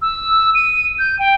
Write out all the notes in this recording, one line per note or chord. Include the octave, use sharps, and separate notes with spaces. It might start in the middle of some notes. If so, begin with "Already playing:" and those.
E6
D#7
G6
G5